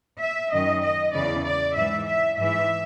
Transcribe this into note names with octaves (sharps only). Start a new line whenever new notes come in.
E5
F#2 D#3 D#5
D#5
E2 C#3 E3 D5
D5
G#2 E3 E5
E5
G#2 E3 E5